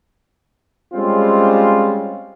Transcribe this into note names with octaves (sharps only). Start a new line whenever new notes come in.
G3 G#3 C4 C#4 F4